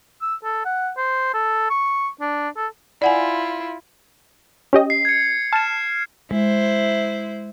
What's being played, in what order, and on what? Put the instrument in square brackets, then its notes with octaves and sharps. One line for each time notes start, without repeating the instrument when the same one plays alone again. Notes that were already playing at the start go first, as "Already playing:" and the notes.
[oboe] E6
A4
F#5
C5
A4
C#6
D4
A4
[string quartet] E4 F4 [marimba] D5 F#5 G#5
[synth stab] C#4 G4 D#5
[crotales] C7
G#6 C#7
[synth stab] A5 [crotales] F6 E7
[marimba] G#3 [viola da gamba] E4 C5